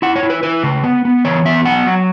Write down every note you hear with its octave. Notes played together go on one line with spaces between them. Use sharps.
E4 F#5
C#5
E4
B4
E4 B4
C#3
B3
B3
E3 C#5
B3 E5
F#3 F#5
F#3